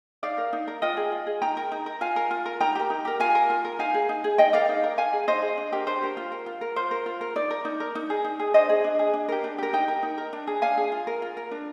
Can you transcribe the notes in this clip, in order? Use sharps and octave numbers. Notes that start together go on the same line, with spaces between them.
D#4 D5 F5
A#4
D#4
A#4
F4 D#5 G5
G#4
F4
G#4
D#4 G5 A#5
A#4
D#4
A#4
F4 F5 G#5
A#4
F4
A#4
D#4 G5 A#5
G4 A#4
D#4
G4 A#4
F4 F5 G#5
A#4
F4
A#4
D#4 F5 G#5
G#4
D#4
G#4
D#4 D#5 G5
A#4 D5 F5
D#4
A#4
D#4 F5 G#5
G#4
D#4 C5 D#5
G#4
D4
G4 A#4
D4 C5
G4 A#4
F4
A#4
F4
A#4
F4 C5
A#4
F4
A#4
D#4 D5
A#4
D#4
A#4
D#4
G#4
D#4
G#4
D4 C5 D#5
G#4
D4
G#4
D4
G4 A#4
D4
G4 A#4
D#4 D#5 G5
A#4
D#4
A#4
D4
G#4
D4 F5 G#5
G#4
F4
A#4
F4
A#4
D4